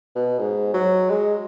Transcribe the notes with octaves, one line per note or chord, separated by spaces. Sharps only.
B2
G#2
F#3
G#3